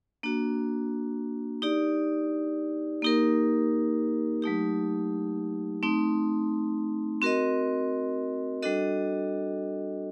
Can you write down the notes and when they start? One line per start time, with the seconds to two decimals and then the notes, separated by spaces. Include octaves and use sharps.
0.23 A#3 D4 F#4
1.62 D#4 G4 D5
3.02 A#3 D#4 G4 A#4
4.42 F#3 A3 D#4 G4
5.83 A3 C4 D#4
7.22 C4 F#4 A#4 D#5
8.63 G3 D4 F#4 A4 D#5